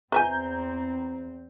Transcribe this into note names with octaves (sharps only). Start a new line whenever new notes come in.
E2 C4 B4 E5 G#5 A#5 G6